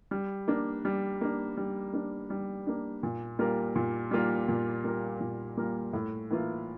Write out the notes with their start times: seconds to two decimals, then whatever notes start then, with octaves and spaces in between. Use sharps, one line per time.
0.11 G3
0.48 A#3 D4
0.85 G3
1.21 A#3 D4
1.57 G3
1.93 A#3 D4
2.30 G3
2.67 A#3 D4
3.03 A#2
3.39 G3 A#3 F4 A#4
3.76 A#2
4.11 G3 A#3 F4 A#4
4.48 A#2
4.84 G3 A#3 F4 A#4
5.20 A#2
5.57 G3 A#3 F4 A#4
5.93 A2
6.30 E3 A#3 F4